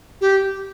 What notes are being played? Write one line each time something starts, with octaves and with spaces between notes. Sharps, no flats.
G4